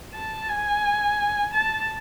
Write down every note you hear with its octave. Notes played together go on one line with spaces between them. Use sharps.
A5
G#5
A5